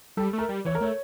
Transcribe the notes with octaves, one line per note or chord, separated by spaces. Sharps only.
G3 A4
A3
A#4
G3
E3 C#5
A#4
A3 C#5